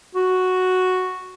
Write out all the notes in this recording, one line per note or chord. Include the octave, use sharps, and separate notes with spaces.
F#4